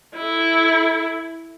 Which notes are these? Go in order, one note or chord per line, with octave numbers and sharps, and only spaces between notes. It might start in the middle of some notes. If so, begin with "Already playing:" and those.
E4 A4